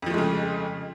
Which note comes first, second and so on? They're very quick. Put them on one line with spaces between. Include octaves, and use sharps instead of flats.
F2 F3 A3 G#3 C#3